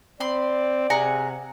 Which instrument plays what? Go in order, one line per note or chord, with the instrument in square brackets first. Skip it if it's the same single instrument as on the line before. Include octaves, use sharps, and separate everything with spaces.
[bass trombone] C4 [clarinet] D5 [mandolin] B5 C6
[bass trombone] C3 [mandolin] G#4 F#5 A#5